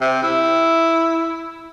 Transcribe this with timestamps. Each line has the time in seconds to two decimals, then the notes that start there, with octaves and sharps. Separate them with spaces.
0.01 C3
0.23 E4